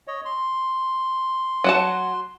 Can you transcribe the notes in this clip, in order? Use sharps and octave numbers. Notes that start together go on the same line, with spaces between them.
C#5 D#5
C6
F#3 F#4 A5